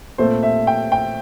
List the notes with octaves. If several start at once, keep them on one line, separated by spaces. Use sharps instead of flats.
A#2 A3 C4 C5
E5
G5
G5